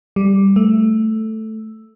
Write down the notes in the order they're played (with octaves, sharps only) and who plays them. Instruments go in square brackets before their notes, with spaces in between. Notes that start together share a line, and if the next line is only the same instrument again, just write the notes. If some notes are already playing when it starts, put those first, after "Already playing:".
[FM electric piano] G3
A3